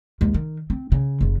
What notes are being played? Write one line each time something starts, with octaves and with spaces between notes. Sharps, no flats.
D#2 G#3
D#3
C4
C#3
F#1 D#2